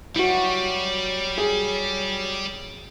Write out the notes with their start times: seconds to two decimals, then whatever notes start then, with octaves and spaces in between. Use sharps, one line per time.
0.16 F#3 G3 E4 F#4
1.38 G#4